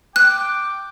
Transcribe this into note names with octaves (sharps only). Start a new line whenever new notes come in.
G5 D6 F#6